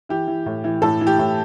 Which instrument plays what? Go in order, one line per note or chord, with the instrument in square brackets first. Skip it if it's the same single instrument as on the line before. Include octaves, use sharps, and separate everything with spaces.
[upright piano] E3 G4
E3
A2
E3
A2 A4
E3
G4
A2